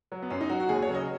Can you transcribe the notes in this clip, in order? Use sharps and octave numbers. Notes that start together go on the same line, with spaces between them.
F#3
B3
F#2 C#4
D#4
F#3 F#4
F#4
D#2 G#4
C#5
C#3 F#3
D#5